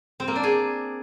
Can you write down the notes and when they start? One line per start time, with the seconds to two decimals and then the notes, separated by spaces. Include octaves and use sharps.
0.20 C4
0.28 A#3
0.36 D4
0.43 G#4